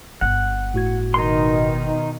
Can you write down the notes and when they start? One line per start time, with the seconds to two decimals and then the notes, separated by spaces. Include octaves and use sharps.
0.21 G1 F#5
0.74 A2 F#4 G#6
1.14 B2 D#3 D#4 C6